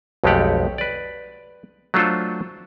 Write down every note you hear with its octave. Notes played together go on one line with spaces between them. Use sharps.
B1 F2 G#3 A3 G4 F#5
B4 D5
F#3 A3 D4 F4 A4 C5